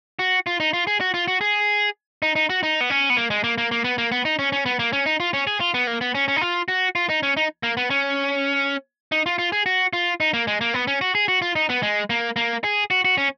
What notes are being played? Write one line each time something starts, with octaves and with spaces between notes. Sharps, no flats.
F#4
F4
D#4
F4
G#4
F#4
F4
F#4
G#4
D#4
D#4
F#4
D#4
B3
C#4
B3
A#3
G#3
A#3
A#3
A#3
B3
A#3
B3
D#4
C#4
C#4
B3
A#3
C#4
D#4
F4
C#4
G#4
F4
B3
A#3
B3
C#4
C#4
D#4
F4
F#4
F4
D#4
C#4
D#4
A#3
B3
C#4
D#4
F4
F4
G#4
F#4
F4
D#4
A#3
G#3
A#3
B3
C#4
F#4
G#4
F#4
F4
D#4
B3
G#3
A#3
A#3
G#4
F#4
F#4
C#4